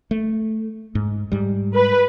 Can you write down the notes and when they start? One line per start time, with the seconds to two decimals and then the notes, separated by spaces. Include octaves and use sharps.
0.11 A3
0.95 G#2
1.32 G#2 G3
1.75 B4